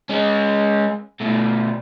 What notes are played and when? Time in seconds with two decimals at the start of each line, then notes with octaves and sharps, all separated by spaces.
0.09 G#3 C#4
1.21 B2 A3